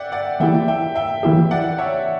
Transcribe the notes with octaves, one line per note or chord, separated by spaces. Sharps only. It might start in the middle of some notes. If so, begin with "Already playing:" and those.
Already playing: D5 E5 F#5 G5
D5 F#5
E3 A#3 E4 G4 E5 G5
E5 G5
E5 G5
E3 A#3 E4 G4 E5 G5
D5 F#5
C#5 E5